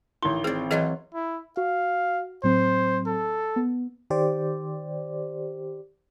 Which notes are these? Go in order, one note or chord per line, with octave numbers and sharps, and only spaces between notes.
A1 D#3 E4 G7
C4 G#4 D5
E3 F#3 F4 G#4 D#5
E4
F#4 F5
A2 F#3 C4 C5
A4
B3
D#3 G4 C5 D5